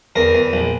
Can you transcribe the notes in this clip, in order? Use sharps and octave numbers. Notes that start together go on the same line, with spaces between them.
E2 A#4
E2
A#1